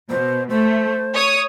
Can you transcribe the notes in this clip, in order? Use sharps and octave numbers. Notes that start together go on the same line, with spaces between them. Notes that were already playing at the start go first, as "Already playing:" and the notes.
B2 C5
A3 C5
C#5 D#6